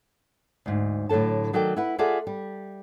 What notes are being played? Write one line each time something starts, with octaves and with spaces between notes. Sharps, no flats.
D2 G#2
A2 D3 F#3 A4 A5
D#3 F#3 A4 D5 G5
E4 B4 F#5
F4 G#4 A4 D5 E5 F#5
G3